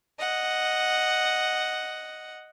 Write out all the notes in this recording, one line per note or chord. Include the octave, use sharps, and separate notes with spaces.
D#5 F#5